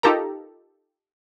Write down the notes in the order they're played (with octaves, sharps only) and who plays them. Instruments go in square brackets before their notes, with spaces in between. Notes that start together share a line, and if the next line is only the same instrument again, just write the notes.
[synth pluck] D#4 F4 G4 A4 A#4 A#5